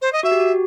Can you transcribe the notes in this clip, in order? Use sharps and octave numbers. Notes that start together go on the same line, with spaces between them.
C5
D#5
F#4 E5
G4
F#4